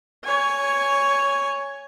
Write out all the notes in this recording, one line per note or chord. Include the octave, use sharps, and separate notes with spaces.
C#5 G#5